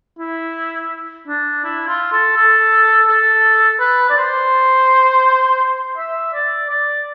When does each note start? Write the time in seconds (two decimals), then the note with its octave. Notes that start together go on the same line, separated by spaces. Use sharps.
0.19 E4
1.28 D4
1.65 E4
1.88 F4
2.13 A4
2.37 A4
3.08 A4
3.80 B4
4.10 D5
4.17 C5
5.98 E5
6.34 D5
6.70 D5